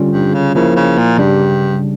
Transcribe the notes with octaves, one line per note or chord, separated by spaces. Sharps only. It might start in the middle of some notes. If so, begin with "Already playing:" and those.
Already playing: D3 G3 C#4 F4
G2
C#3
C#3 F3 A#3 E4 A#4
C#3
A#2
G2 C#3 G3 D4